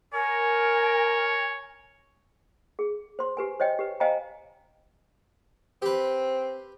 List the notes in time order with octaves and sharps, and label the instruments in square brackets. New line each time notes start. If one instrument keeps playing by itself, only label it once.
[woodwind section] A#4 [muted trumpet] C#5 [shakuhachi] G#5
[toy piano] G#4
C5 C6
G4 B4 G#5
C5 C#5 D#5 G5
G4 B4
C5 D#5 F5 G5 G#5 A#5
[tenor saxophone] C4 [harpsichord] G4 B4